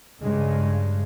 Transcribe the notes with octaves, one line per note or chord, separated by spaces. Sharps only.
G2 C#3 G#3